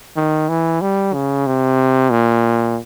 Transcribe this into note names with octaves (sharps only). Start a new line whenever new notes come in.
D#3
E3
G3
C#3
C3
A#2